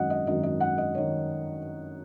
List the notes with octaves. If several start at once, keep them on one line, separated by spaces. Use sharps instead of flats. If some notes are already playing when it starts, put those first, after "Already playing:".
Already playing: G#1 F#2 D#3 D#5 F#5
D#5
G#1 F#2 D#3 D#5
D#5
F#5
D#5
D#3 C#5